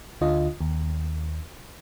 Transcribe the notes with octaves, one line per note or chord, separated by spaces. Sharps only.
D2 D3 F4 D#5
D#2